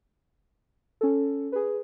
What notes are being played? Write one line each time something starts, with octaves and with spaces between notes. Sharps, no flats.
C#4 A4
G#4 B4